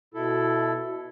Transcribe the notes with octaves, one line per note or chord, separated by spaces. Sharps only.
B2 E4 A4